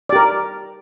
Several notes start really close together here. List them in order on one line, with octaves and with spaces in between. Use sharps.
D5 G4 A#4